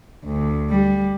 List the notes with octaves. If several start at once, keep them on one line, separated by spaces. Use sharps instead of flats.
D2
G3